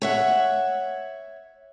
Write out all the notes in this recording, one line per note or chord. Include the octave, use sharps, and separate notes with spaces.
C#5 E5 F#5